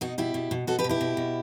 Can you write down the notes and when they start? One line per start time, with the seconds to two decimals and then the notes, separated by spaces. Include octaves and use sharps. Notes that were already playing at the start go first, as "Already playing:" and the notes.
0.01 B2 D#4 F#4
0.18 B2 E4 G4
0.34 B2
0.51 B2
0.67 B2 F#4 A4
0.79 G4 B4
0.84 B2
0.89 E4 G4
1.01 B2
1.17 B2